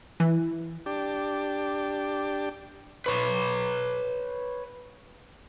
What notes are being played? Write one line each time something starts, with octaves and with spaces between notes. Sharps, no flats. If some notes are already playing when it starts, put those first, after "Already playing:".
E3
D4 G4
B4 C#5